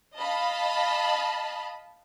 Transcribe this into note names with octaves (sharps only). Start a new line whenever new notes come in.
D#5 F5 A5 B5